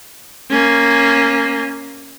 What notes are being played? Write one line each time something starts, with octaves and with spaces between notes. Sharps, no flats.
A#3 C#4